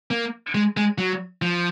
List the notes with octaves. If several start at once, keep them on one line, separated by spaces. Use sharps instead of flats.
A#3
G#3
G#3
F#3
F3